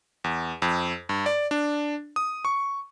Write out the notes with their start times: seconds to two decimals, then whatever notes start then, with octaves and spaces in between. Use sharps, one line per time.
0.24 E2
0.62 F2
1.09 G2
1.26 D5
1.51 D4
2.16 D#6
2.45 C#6